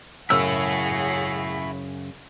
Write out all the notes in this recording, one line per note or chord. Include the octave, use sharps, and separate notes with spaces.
F#2 C#3 E4 F#4 G#4 C#5 E6